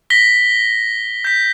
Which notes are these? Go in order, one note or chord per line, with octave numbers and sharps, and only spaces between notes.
A#6 B6 G7
G6 B6